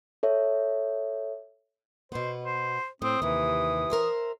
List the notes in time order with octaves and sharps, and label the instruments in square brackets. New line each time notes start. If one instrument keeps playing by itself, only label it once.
[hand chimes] A4 C#5 E5
[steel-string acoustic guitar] B2 B3 [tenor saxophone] C5
[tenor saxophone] C5
[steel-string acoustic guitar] A2 [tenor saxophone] C4 [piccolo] D#6
[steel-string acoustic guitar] D#2 C3 [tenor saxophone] E3
[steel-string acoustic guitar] A#4 C5 E5